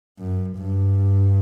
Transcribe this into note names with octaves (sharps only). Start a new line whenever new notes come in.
F#2
G2